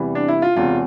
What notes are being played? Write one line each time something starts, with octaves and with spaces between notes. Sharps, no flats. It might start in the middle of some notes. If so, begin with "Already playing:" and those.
Already playing: E2 C3 E3 G3
D4
E4
F4
E1 E2 C3 F4